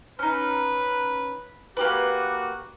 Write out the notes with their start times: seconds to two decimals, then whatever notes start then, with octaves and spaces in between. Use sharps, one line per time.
0.19 C#4 D#4 B4
1.77 A#3 F#4 G4 B4